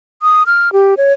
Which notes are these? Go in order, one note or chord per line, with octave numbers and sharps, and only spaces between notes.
D#6
F6
G4
C#5